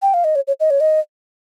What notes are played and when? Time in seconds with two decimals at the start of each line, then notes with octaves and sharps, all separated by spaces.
0.02 G5
0.14 F5
0.24 D#5
0.36 C#5
0.47 C#5
0.60 D#5
0.70 C#5
0.80 D#5